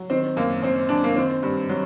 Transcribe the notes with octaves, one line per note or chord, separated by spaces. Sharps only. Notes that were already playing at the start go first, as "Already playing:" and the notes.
Already playing: F#3
D#3 C4
F#2 A#3
F#2 C4
F#2 D4
A#3
D#3 C4
G2
F#3